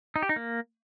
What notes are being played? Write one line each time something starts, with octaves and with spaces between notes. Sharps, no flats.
D#4
G4
D#4
A#3